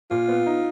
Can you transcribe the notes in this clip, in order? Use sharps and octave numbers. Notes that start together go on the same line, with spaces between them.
A#2 F4
B3
D#4